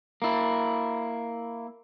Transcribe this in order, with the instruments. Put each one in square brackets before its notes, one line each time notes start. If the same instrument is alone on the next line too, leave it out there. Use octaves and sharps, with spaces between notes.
[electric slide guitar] A#3 E4